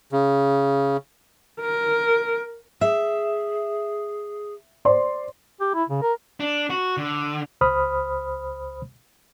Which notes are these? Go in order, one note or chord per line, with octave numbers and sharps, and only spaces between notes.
C#3
A#4
G#4 E5
C5 D5 C6
G4
E4
C#3
A#4
D4
F#4
D3
C#2 C5 B5 D#6 F6